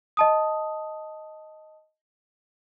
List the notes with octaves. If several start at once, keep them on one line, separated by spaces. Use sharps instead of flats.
D#5 A5 D#6